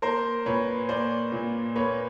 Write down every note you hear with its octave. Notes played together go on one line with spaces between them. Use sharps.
A#3 A#4 C5
A#2 B4 C#5
A#3 C5 D5
A#2
A#3 B4 C#5